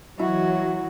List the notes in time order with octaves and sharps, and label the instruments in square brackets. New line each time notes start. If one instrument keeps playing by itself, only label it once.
[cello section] E3 F#3 [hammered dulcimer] E4 [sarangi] F#4